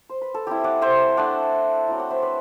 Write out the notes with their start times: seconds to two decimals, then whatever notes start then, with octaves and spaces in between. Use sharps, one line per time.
0.10 C5
0.22 B4
0.34 A4
0.47 G3 C4 E4 G4
0.64 D5 F#5
0.82 C5 E5
1.17 A3 D4 D5 F#5
1.87 F#3 C4 E4
1.99 D5 F#5
2.11 C5 E5
2.22 B4 D5